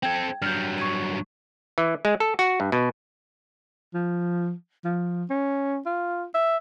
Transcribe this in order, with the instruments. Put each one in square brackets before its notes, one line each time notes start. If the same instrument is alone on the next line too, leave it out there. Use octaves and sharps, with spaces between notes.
[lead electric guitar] C4 A4 [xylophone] G5 G#6
[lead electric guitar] G2 F#3 [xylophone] F6 G6
[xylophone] C#6 G#6 D#7
[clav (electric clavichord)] E3
G#3
A4
F#4
G2
B2
[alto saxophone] F3
F3
C#4
F4
E5